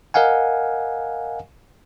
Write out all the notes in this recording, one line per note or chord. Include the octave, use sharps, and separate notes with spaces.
A#4 D#5 F5 F#5 G#5